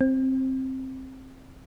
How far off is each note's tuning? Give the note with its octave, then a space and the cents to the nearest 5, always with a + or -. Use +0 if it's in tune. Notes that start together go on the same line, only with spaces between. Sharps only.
C4 +10